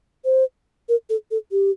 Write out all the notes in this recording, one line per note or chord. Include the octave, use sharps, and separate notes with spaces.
C5
A#4
A4
A4
G4